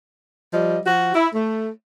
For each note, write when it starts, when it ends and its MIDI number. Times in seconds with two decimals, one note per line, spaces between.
0.53 0.78 53
0.53 0.78 55
0.53 0.78 75
0.85 1.12 53
0.85 1.12 66
1.14 1.28 64
1.33 1.69 57